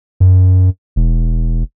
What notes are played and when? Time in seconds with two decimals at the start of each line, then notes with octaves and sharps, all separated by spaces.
0.20 F#2
0.96 E1